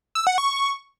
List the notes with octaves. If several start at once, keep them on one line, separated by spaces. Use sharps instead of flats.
E6
F#5
C#6